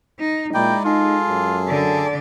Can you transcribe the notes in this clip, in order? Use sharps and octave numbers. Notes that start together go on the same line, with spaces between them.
D#4
A#2 G#3 D#4 E4 D5 G5
D#4 F4 G#4 A4
F#2
D3 D5